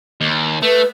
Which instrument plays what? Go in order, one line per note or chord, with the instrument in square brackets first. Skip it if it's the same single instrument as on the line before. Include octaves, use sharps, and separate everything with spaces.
[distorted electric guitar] D#2
[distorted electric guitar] A3 [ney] B4